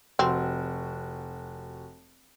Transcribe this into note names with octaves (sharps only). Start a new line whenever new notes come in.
F1 C4 F#4